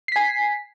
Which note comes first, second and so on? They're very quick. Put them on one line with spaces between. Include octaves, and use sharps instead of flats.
C7 B6 G#5